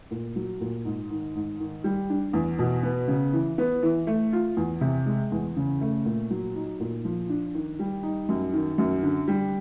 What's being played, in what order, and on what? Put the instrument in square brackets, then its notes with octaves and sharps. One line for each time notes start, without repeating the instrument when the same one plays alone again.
[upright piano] A#2
F#3
A#2
G#2
D#3
G#2
D#3
G3
D4
E2
B2
B3
C#3
E3
B3
E3
A3
F4
E2
C3
G#3
E2
C#3
A3
A#2
F#3
D#4
A#2
F3
D4
D#3
G3
D#4
F#2
D#3
F#2
D3
G3